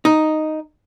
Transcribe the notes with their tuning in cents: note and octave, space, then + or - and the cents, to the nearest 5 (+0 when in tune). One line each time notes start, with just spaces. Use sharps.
D#4 +0